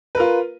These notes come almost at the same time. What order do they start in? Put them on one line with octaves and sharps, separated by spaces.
B4 A#4 F4